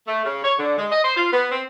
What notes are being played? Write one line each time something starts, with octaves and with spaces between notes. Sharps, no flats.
A3
C#3
C#5
D3
G#3
D#5
C5
F4
B3
C4